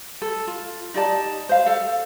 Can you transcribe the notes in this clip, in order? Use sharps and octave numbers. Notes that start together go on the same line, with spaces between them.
A4
F4
D#4 G4 D5 A5
C5 F5
A4 F5